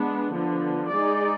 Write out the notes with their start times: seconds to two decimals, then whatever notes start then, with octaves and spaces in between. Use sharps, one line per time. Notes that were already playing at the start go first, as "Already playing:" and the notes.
Already playing: G#3 B3 D4
0.33 D3 F3 B3
0.91 G#3 D#4 G#4 D5